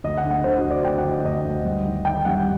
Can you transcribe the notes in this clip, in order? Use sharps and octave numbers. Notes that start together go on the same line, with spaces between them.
D2 D#5
F#5
D3
F#5
D3 C5
F#4
D2
D5
D2 G5
F#5
D2
D#5
D2 D#5
D2
G2
D#3
D#3 G5
G2 F#5